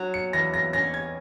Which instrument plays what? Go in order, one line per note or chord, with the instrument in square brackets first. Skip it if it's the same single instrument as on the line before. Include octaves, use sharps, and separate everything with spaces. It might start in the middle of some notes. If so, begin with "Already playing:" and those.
Already playing: [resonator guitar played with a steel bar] F#3
[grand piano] C#7
[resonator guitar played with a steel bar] E2 [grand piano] A#6
[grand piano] A#6
[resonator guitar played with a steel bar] C#4 [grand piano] A#6
[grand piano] G#6